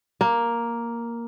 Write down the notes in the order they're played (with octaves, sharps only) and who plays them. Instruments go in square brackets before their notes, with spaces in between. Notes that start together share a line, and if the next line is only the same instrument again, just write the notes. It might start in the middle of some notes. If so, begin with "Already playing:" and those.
[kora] A#3